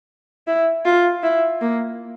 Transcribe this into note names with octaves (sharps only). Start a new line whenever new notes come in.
E4
F4
E4
A#3